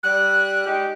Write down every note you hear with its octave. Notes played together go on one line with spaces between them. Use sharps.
G3 F#6
G#3 D#4 G4